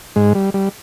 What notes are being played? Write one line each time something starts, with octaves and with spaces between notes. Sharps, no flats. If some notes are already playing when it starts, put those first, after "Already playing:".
G#2 G#3
G3
G3